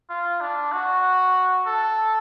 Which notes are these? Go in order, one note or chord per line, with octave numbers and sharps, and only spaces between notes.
F4
D4
F#4
A4